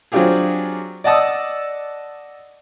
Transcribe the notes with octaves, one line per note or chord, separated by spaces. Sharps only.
F#3 C4 D4 F4 G4 G#4
D5 D#5 F#5 A5 D#6 E6